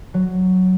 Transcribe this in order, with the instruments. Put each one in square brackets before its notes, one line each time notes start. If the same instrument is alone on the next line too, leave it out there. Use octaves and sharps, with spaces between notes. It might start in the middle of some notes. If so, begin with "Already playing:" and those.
[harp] F#3